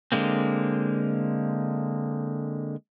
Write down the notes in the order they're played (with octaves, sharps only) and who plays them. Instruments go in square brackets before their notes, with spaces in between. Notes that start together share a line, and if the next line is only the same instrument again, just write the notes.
[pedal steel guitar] D3 G#3 A#3 C4